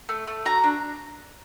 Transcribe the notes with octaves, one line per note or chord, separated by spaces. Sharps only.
A3
A3
F#4 A#5
D4